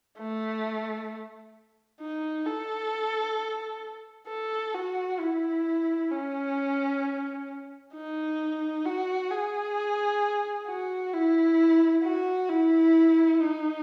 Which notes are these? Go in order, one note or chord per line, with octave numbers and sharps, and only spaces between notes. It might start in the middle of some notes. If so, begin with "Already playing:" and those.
A3
D#4
A4
A4
F#4
E4
C#4
D#4
F#4
G#4
F#4
E4
F#4
E4
D#4